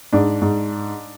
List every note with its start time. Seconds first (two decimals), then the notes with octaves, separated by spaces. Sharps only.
0.13 G#2 D4
0.41 G#2